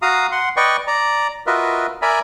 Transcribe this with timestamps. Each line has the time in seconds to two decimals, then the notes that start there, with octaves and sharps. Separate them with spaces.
0.02 F#4 F5 A#5 D#6
0.32 F#5 C6
0.57 B4 D5 D#5 G5 C#6
0.87 D5 A#5
1.47 F4 F#4 A#4 B4 D#5 E5
2.02 A#4 D5 E5 G#5 A#5 B5